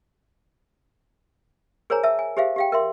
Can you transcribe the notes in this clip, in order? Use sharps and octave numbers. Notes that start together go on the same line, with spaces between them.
G#4 A#4 C5 C#5 G#5 A#5
E5 A5 E6
G#5
G4 G#4 C5 E5 F5
G4 F5 G5
A#4 E5 C6